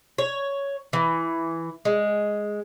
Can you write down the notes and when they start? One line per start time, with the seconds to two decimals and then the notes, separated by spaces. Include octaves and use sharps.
0.18 C#5
0.93 E3
1.85 G#3